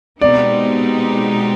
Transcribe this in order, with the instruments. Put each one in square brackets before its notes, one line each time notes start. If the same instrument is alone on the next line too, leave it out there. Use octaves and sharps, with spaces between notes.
[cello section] B2 G#3 C4 D#4 G4 [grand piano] D5